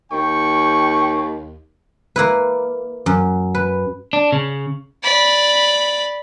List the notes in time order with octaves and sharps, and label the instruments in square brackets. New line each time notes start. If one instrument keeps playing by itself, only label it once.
[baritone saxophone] D#2 [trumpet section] G5 C#6
[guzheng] A#3 E4 B4
F#2
B4
[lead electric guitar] D4
C#3
[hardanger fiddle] D5 B5